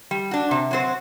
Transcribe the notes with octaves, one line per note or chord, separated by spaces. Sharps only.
G3
D4 F#4
C3
F#3 C4 F#4 C5